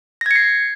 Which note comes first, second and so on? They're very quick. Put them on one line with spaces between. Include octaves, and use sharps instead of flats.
A#6 G#6 C#7 C7